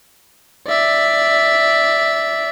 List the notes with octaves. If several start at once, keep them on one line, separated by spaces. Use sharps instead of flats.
D5 E5